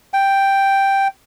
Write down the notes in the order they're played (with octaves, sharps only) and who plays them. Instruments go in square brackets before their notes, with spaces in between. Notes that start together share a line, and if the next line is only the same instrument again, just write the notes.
[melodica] G5